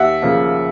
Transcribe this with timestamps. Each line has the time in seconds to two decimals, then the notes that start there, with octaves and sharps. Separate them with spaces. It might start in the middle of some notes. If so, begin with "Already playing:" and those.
Already playing: D#2 E5 F#5
0.22 C#3 F3 A#3